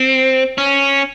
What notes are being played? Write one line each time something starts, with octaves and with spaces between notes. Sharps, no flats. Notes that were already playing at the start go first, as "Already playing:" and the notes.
Already playing: C4
C#4